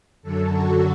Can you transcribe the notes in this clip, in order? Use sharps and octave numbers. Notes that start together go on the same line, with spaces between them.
F#2 D3 F#3 A4
F#4